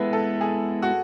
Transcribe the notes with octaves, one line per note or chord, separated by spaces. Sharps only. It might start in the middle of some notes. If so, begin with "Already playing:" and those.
Already playing: G#3 B3 E4 A4 B4
A4
G#4
F#4